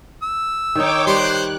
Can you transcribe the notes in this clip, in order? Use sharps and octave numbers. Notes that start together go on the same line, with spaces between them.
E6
D#3 D#4 C#5 G5 D6
G3 C5 C6 F#6